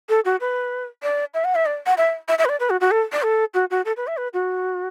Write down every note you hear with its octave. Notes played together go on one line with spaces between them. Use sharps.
A4
F#4
B4
D5
E5
F#5
E5
D5
F#5
E5
E5
E5
B4
D5
B4
F#4
F#4
A4
D5
A4
F#4
F#4
A4
B4
E5
B4
F#4